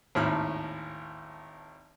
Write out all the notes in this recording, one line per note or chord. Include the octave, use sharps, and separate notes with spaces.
G#1 D#2 A2 B5 F6